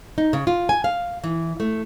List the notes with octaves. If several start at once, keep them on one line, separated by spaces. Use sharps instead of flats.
D#4
C#3
F4
G#5
F5
E3
A3